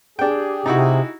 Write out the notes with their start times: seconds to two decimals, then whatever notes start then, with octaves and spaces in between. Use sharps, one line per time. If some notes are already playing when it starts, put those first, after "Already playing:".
0.19 D4 G4 G#4 G5
0.66 C3 D#4 E4 F#4